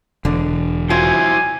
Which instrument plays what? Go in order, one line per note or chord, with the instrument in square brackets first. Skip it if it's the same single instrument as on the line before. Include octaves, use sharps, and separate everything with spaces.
[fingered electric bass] E1 [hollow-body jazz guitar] D3
[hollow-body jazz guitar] F#3 F4 [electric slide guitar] E4 C5 G5 [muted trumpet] G#5